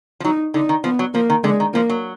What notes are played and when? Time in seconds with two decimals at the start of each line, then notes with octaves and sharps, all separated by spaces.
0.20 F3
0.24 F#3 D#4
0.54 D3 D#4
0.69 D#3
0.84 F3 B3
0.99 F#3
1.14 F3 A#3
1.30 D#3
1.44 D3 G#3
1.60 D#3
1.74 F3 A#3
1.90 F#3